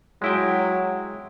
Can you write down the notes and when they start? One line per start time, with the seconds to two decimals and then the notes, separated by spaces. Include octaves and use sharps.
0.22 F#3 G#3 E4 G5